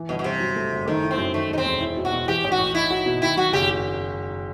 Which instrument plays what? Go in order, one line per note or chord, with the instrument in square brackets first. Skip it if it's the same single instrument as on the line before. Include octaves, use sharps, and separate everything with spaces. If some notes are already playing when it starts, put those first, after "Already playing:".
Already playing: [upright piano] E3
[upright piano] G1 [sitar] B2
[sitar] B2
[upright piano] G1 [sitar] C3
[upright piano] F#3
A3
F#1
[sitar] D#3 [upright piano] A3
[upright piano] E4
[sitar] C4
[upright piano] F#2
[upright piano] D#3 [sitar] A3
[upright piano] E1 [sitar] D#4
[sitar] C4
[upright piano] E1
E4
B2
[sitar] F#4
[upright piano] B2
[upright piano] E3 [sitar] G4
[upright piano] A1
[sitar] F#4
[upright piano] A1
[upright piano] D#4 [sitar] E4
[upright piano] F#4
B2
[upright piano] D#3 [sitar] E4
[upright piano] F#3 [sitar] F#4
[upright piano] F#1 [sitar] G4